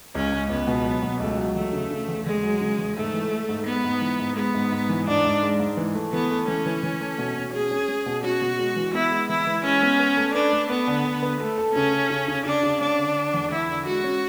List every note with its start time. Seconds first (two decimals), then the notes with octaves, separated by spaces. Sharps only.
0.15 C#2 C#4
0.32 C#2
0.50 C#2 B3
0.67 B2
0.85 F#3
1.02 B2
1.20 C#2 A3
1.38 F#3
1.55 E2 A3
1.73 C#3
1.91 C#3
2.08 E2
2.26 E2 G#3
2.43 F#3
2.61 C#3
2.79 E2
2.96 G#2 A3
3.14 E3
3.31 G#3
3.49 G#2
3.66 G#3 B3
3.84 G#2
4.02 E3
4.19 G#2
4.36 G#3 B3
4.54 G#2
4.72 G#2
4.90 E3
5.07 G#2 D4
5.25 G#2
5.43 G#3
5.60 G#2
5.77 E3
5.95 A3
6.13 E3 B3
6.31 A3
6.48 E3 C#4
6.66 E3
6.83 E3
7.01 A3
7.18 B2
7.36 B2
7.53 C#4 G#4
7.71 C#4
7.89 C#4
8.06 B2
8.24 C#4 F#4
8.41 B2
8.59 G#3
8.76 E3
8.94 B3 E4
9.12 G#3
9.29 E3 E4
9.47 E3
9.64 G#3 C#4
9.82 B3
9.99 B4
10.17 A3
10.34 D4 B4
10.52 A3
10.70 B3 B4
10.88 D3
11.05 D3
11.23 B4
11.40 A3 A4
11.58 A4
11.75 C#3 C#4
11.93 A4
12.10 C#3
12.28 C#3
12.46 C#3 D4
12.63 C#3
12.81 C#4 D4
12.99 D3
13.16 D3
13.34 E2
13.51 E2 E4
13.69 D3
13.86 G#3 F#4
14.04 C#4